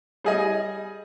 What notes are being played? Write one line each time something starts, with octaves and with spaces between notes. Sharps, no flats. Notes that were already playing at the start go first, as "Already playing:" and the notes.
G3 G#4 D#5